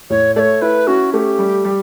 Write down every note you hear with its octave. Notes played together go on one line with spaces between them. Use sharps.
A2 C#5
A3 C#5 D5
E4 B4
C#4 F#4
A3 G4
G3
G3